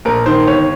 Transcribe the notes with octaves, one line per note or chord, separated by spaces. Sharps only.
A#1 A#4
D#3 C5
G1 C#5